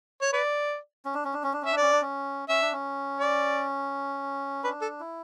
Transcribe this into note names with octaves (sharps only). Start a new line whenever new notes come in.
C#5
B4 D5
C#4
D4
C#4
D4
C#4
D4
C#4 E5
D4
C#4 D5
D4
C#4
C#4 E5
D4
C#4
D5
D4 B4
A4
E4